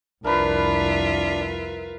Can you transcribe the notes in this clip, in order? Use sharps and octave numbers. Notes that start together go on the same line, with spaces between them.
C2 F2 D4 F4 A#4 B4 E5